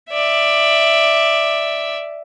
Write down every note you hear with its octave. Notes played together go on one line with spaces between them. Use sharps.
D5 E5